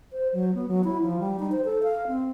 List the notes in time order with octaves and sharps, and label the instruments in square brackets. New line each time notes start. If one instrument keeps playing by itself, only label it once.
[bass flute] C5
F#3
B3
F#3
E4
F3
G3
D#4
C5
A4
F5
C4